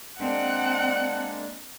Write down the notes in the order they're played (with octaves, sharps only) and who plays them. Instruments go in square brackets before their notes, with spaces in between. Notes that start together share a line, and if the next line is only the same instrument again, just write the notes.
[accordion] G#3 A#3 D4 [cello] C4 [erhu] F#5